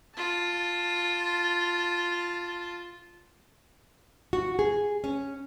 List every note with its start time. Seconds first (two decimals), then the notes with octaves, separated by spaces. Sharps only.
0.14 F4 A5
4.33 F#4
4.59 G#4
5.04 C#4